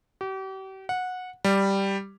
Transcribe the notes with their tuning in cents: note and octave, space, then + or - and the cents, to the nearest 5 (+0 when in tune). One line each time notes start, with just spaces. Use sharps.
G4 -40
F#5 -15
G3 +0